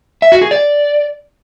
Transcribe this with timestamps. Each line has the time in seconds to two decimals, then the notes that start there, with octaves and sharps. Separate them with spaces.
0.22 E5
0.32 F#4
0.41 G#4
0.51 D5